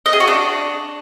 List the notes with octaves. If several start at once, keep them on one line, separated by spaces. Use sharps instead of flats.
D#5
G#4
F#4
D4